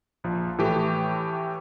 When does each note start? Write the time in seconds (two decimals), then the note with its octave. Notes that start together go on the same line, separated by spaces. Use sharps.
0.24 A#1 F3
0.58 A2 E3 A3 G4